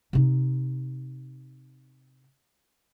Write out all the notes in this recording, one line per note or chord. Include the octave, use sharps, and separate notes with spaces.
C3 D#4